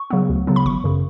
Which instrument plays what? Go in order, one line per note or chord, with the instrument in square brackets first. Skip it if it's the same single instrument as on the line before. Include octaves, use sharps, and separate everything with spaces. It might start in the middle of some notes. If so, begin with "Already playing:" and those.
Already playing: [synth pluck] C#6
C#3 F#3 B3
D2
C#3 F#3 B3
B5
G#1 C#6
F#2 C#3